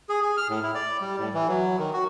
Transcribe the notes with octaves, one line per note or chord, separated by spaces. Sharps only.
G#4
G#4
F6
A2
E4
D5
G3
A2
E3
F#3
D#3
F#4